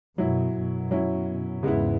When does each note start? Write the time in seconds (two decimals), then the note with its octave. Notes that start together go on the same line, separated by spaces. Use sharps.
0.17 F#2 B2 F#3 E4
0.54 F#2 B2
0.91 F#3 C#4 E4
1.63 E2 G#2 C#3 G#3 B3 E4